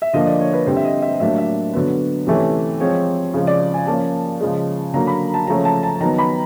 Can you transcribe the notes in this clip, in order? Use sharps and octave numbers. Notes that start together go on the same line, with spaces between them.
E5
D3 F3 A#3 D#5
D5
C#5
B4
D3 G3 C4 C5
E5
D#5
E5
A2 F#3 A#3 D4 E5
E5
D3 F#3 B3
C3 E3 A3 C#4
F3 G#3 C4 C#5
C#3 F3 G#3
D5
G#5
F3 A#3 C#4 A5
C#3 F3 G#3
D3 F#3 A#3 A#5
B5
A5
C#3 F3 A3 C#4 A#5
A5
A5
D#3 F#3 B3 A#5
B5